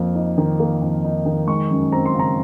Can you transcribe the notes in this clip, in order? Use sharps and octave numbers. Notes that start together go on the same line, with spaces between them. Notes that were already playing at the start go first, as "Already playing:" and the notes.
Already playing: F2 A#3
D#4
D#3
A#3
F2
D#4
D#3
G#3 C#6
F#2
C4 A#5
C6
C#3 A#5